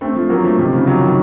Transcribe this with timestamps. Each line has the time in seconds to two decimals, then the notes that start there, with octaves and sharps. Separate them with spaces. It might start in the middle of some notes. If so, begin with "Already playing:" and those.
0.01 A3 C4
0.15 F3 A3
0.30 F#3 A#3
0.44 F3 A3
0.58 C3 D#3
0.72 C#3 F3
0.86 D#3 F#3
1.00 D#3 F#3